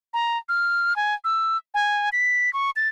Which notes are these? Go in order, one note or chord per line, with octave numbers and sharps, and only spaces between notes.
A#5
F6
G#5
E6
G#5
B6
C#6
A6